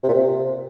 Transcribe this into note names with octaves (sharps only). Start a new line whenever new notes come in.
C3
A#2
C3